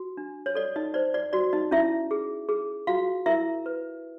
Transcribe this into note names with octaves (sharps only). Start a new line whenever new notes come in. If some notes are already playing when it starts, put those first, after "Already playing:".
Already playing: F#4
D4
C#5
A4 D5
D#4 D#5
C5 D5
D5
F#4 D5
D#4 D#5
C#4 E4 E5
G#4
G#4
F4 F#4 F5
E4 A#4 E5
B4